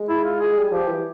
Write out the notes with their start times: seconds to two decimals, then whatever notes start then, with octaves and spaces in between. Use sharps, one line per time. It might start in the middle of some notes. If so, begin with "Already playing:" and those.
Already playing: G#3
0.09 E4
0.24 F4
0.40 G#4
0.52 G#3
0.56 G3
0.71 F3 G4
0.87 E3